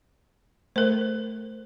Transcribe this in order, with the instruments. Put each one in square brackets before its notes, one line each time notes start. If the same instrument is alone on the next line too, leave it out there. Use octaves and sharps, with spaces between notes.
[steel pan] A3 [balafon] A#4 C5